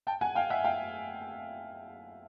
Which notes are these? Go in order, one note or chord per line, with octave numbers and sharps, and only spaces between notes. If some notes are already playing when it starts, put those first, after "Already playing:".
G5 A5
F#5 G#5
F5 G5
E5 F#5
F5 G5